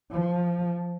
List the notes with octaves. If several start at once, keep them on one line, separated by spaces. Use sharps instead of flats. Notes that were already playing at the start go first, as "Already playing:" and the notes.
F3